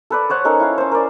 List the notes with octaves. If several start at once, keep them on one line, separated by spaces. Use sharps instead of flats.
A4 B4 D5
C5 C#5 F#5
C#4 D#4 A4 A#4
E4 F5
C#4 C5
A#4 D5